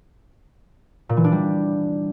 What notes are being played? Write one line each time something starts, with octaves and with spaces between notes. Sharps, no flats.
A#2
E3
D4
G3